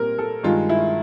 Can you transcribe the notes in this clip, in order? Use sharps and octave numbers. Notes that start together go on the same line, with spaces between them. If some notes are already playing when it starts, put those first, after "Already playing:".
Already playing: A#2 G3 C4 A#4
A4
G2 D#3 G#3 F4
E4